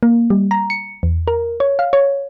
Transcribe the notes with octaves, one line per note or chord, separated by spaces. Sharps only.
A#3
G3
A#5
C#7
E2
A#4
C#5
F5
C#5